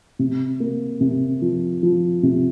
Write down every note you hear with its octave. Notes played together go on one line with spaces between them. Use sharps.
C3
A#3
C3
F3
F3
C3